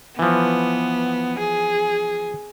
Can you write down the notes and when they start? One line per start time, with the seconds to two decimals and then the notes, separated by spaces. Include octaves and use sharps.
0.19 E3 F3 B3
1.39 G#4